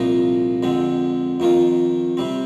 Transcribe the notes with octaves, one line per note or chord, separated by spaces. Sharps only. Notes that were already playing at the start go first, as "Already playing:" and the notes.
Already playing: C2 A#2 F3 A#3 D#4
F2 D3 G#3 C4
F2 D#3 A#3 F4
C3 G3 C4